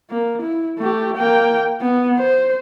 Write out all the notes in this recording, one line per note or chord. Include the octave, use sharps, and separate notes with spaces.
A#3
E4
A3 G4
A#3 G5
B3
C5